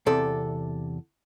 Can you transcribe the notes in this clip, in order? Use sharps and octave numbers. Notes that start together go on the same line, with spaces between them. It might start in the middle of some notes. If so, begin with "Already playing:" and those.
E2 C3 A4 D5